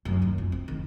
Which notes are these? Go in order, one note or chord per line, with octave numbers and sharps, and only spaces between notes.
F#2
D#2
F2
C4
D#3